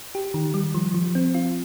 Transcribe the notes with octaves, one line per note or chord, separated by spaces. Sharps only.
G4
D#3
G3
F3
F3
C4
F4